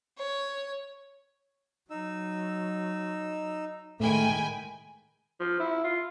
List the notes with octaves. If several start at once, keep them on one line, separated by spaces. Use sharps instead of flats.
C#5
F#3 D#4 E6
A2 D#3 G#3 A3 G5 G#5 B5
F3
E4
F4